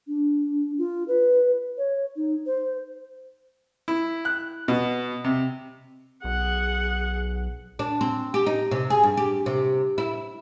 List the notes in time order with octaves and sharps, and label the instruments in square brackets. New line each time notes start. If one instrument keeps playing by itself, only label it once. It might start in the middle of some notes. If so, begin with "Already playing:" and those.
[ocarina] D4
F4
B4
C#5
D#4
C5
[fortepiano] E4
F#6
B2
C3
[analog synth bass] B1 [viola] G#4 F#5
[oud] D4
C4
G4
D#4
C3
G#4
G2
G4
C3
E4